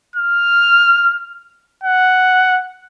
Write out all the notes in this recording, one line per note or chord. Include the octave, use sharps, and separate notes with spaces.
F6
F#5